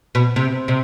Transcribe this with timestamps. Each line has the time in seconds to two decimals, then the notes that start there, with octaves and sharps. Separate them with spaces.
0.15 B2
0.36 C3
0.68 C3